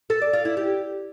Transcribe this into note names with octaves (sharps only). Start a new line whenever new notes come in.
A4
D5
F4
E4
G4